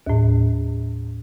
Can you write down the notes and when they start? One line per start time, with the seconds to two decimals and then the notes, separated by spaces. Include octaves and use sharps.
0.07 D#2 A2